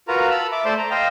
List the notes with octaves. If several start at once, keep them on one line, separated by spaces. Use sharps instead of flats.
F4 F#4 A#4 B4 A#5
A5 B5 E6
E5 D6
A3 C5 D5 A5 C6
A#5
C5 D#5 F5 G5